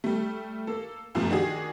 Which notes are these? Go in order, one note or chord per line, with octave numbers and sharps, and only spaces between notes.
G3 A3
A#3 A4
C#2 F#2 A#2 F3 A3
D#3 D4 F#4 G#4